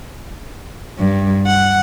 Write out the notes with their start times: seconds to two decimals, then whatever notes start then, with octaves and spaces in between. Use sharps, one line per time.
0.98 G2
1.47 F#5